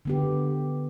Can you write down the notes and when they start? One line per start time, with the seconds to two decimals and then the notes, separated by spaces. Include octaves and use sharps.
0.05 D3 B3 G4